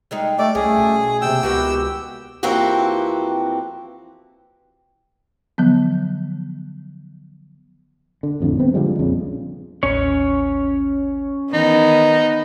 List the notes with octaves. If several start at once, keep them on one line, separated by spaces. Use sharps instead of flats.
G3 G#3 D#4
A3 G4 D5
C2 A3 C#4 G#4
B2
D#2 C3 G3 G5 E6
C#2 D#3 B3 F#4 G4
F2 E3 A#3 C4 F#4 G4
D3 F3 F#3 B3
D3
A1 F2 A2 D3
G1 B3 C4
D3 F3 G3 G#3
A#1 F2 C#3
A1 D#2 C#4 C#5
D#3 E3 B3 D#4